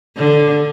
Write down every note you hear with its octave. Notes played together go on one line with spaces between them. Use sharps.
D3